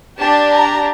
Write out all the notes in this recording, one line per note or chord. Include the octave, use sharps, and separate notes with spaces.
D4 G4 A5
A#5